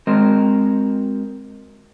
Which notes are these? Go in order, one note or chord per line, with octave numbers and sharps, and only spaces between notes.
G#3 C4 F#4 A#4 C5 D#5